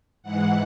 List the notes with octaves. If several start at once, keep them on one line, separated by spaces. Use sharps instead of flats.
G#2 E3 G#3 F#5